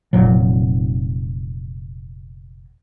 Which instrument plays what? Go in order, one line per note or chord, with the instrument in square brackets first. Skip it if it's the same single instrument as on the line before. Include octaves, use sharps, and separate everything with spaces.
[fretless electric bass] F1 A#2 F#3